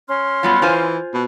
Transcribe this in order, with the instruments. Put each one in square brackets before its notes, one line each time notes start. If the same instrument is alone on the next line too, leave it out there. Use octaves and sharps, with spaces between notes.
[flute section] C#4 C6 F6
[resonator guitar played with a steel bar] F#3 G3 B3 [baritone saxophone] F4
[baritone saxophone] E3 [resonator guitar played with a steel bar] F4 C5 G#5
[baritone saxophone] B2